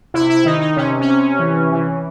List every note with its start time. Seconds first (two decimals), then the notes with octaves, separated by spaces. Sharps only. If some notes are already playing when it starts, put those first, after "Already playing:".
0.14 C3 E4
0.30 E4
0.45 D#3 D#4
0.61 D#4
0.77 C3 C#4
1.01 C#4
1.08 C3
1.39 E3
1.72 E3